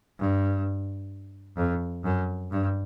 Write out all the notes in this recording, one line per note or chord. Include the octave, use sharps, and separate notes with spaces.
G2
F2
F#2
G2